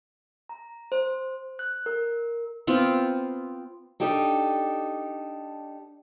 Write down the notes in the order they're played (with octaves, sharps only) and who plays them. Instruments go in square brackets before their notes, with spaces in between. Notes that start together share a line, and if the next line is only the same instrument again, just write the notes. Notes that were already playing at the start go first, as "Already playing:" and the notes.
[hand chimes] A#5
C5
F#6
A#4
[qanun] B3 C4 F4
[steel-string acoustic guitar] D4 D#4 G4 A4 D#5